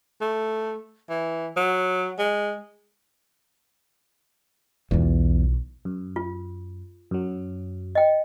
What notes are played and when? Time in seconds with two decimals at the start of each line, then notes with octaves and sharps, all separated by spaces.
0.21 A3
1.09 E3
1.56 F#3
2.18 G#3
4.91 B1 E2 F4
5.85 F#2
6.16 F4
7.11 F#2 F#3
7.95 D#5 G5